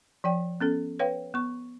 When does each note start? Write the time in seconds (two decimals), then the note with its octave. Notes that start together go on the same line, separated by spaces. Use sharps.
0.24 F3 D5 G5
0.61 B3 C#4 A4
0.99 B4 C#5 F5 G5
1.34 B3 C#6